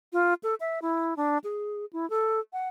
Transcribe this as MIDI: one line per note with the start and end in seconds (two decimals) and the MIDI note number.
0.13 0.34 65
0.43 0.55 69
0.60 0.79 76
0.82 1.14 64
1.17 1.38 62
1.44 1.85 68
1.93 2.08 64
2.10 2.40 69
2.53 2.69 78